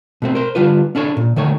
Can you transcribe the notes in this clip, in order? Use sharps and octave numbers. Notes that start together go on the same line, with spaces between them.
B2 A3 C4
A#4 C5
D3 G3 F4 B4
C#4 D4 A4 C#5
A#2
D3 D#3 A3 C#5